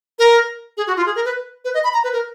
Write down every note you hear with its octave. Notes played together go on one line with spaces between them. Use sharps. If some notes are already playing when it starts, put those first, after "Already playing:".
A#4
G#4
F#4
F4
G#4
A#4
B4
B4
D#5
B5
A#5
B4
A#4